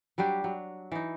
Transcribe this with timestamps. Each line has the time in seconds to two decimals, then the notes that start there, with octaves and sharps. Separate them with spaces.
0.18 F#3 G3 D4 G4
0.44 F#3
0.92 E3 D#4